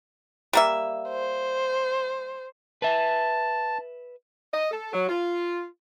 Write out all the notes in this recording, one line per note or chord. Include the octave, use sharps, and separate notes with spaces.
G3 A#3 E5
C5
B4 E5 A5
D#5
A4
F#3
F4